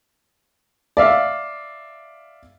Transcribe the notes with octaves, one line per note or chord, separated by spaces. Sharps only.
D5 E5 F5